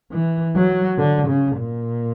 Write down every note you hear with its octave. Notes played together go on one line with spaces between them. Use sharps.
E3
F#3
D3
C#3
A#2